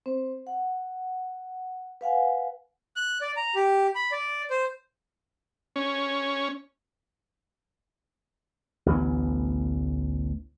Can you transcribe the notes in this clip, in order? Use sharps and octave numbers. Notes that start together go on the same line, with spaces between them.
C4 C5
F#5
B4 F5 F#5 G#5
F#6
D5
A#5
G4
B5
D5
C5
C#4
A1 D2 E3 B3